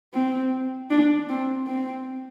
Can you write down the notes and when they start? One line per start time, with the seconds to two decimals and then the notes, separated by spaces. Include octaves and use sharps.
0.13 C4
0.90 D4
1.29 C4
1.67 C4